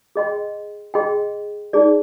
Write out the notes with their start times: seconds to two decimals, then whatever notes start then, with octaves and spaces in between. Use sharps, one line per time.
0.16 G#4 D#5 G5 C6
0.94 G#4 D#5 G5 C6
1.73 D#4 G#4 D5